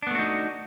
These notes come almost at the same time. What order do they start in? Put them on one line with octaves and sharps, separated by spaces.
D4 B3 A3 F#4 D#4